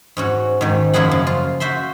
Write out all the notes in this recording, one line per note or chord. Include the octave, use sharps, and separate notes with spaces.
G#2 C#4 F#4
G#2 D#3
F#2 F3 A#3 E4 G#4 F#5
C#3
F4
F#4 C5 E5 C6